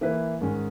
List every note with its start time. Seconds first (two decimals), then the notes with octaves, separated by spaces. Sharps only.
0.01 E3 A#3 E4 B4
0.41 G#2 D#3 G#3 C#4